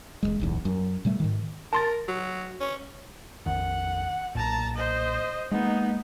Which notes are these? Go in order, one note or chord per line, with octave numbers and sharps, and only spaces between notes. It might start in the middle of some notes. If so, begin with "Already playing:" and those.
E1 C#2 G#3
D1 B1 E2
F#2
B2 G3 A3
G#2 D#3
A#4 A5 C6 A6
F#3
C#4
A#1 F2 D#3 F#5
B1 A#2 A5 A#5
C5 D#5
G#3 A#3 B3 D#4